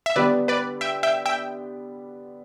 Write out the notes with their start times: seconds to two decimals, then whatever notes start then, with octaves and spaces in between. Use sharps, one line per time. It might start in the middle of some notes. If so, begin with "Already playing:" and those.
0.06 E5
0.16 D3 G3 B3 D4 G4 B4 D5
0.48 B4 D5
0.81 E5 G5
1.03 E5 G5
1.25 E5 G5